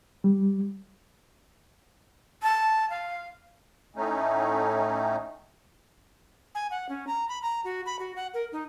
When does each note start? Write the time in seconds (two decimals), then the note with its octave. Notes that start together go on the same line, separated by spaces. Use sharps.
0.24 G3
2.43 A5
2.90 F5
3.96 A2 A3 C#4 D#4
6.55 G#5
6.71 F#5
6.89 C#4
7.07 A#5
7.28 B5
7.42 A#5
7.64 F#4
7.86 B5
7.99 F#4
8.16 F#5
8.34 A#4
8.52 D#4